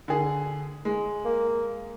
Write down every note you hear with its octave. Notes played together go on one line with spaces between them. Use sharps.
D3 G#4
G#3
A#3